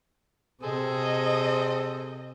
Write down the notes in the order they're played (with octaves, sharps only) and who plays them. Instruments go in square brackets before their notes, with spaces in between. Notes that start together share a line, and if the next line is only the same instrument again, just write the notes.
[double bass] C3 [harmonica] G#4 A4 C5 [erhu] D#5